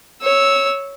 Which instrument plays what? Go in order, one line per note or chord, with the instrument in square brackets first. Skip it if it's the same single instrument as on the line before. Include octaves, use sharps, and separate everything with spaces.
[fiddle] C#5 E6